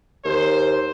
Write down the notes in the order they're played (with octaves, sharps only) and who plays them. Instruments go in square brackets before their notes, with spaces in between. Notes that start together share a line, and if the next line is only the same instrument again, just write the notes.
[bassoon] D#2 [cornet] C5